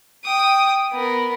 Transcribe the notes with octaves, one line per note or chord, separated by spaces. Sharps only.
G5 D#6
B3 A#4